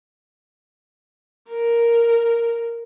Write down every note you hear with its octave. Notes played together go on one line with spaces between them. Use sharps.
A#4